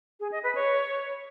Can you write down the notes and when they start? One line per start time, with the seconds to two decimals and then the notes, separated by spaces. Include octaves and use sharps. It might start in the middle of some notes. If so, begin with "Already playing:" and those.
0.20 G#4
0.32 D#5
0.43 B4
0.55 C#5